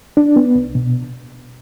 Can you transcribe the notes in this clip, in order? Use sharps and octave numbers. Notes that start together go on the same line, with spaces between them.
D4
B3
C2
B2